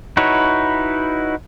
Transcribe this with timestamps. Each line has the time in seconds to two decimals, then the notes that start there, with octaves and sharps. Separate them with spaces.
0.17 D#4 E4 F#4 B4 C#5